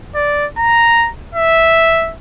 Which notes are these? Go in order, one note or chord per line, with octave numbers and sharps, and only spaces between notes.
D5
A#5
E5